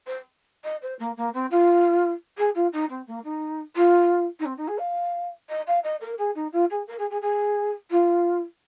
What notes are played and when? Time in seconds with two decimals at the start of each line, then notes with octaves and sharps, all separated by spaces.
0.06 C5
0.63 D#5
0.82 C5
0.99 A#3
1.16 A#3
1.33 C4
1.50 F4
2.37 G#4
2.54 F4
2.72 D#4
2.89 C4
3.06 A#3
3.24 D#4
3.75 F4
4.39 D#4
4.45 C4
4.57 D#4
4.67 G#4
4.79 F5
5.49 D#5
5.66 F5
5.83 D#5
6.00 A#4
6.18 G#4
6.35 D#4
6.52 F4
6.70 G#4
6.87 A#4
6.98 G#4
7.10 G#4
7.21 G#4
7.90 F4